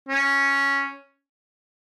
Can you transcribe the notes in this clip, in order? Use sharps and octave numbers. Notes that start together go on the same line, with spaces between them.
C#4